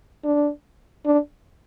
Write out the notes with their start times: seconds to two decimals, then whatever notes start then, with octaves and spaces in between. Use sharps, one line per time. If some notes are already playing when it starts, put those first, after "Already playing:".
0.24 D4
1.06 D4